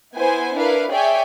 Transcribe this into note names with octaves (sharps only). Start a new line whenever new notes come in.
B3 E4 C5 G#5
D4 E4 A#4 B4 F5
G#4 C#5 D5 E5 G5 G#5